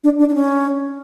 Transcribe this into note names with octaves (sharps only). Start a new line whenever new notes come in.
D4
D4
D4
C#4